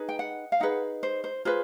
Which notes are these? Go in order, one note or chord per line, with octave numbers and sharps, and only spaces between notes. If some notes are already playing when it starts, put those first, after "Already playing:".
Already playing: D#4 G#4 B4
G5
F#5
F5
D#4 G#4 B4 F#5
C5
C5
F4 G#4 B4 C5